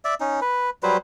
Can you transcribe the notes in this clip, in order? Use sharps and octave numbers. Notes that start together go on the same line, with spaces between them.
D5 E5
C#4 D#4
B4
F#3 G3 B4 C5